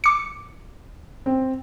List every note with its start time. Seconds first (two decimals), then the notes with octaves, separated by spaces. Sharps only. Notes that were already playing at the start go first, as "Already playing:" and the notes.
0.04 D6 C#7
1.26 C4